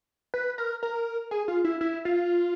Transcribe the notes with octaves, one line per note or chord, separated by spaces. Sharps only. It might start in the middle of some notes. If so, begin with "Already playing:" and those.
B4
A#4
A#4
G#4
F4
E4
E4
F4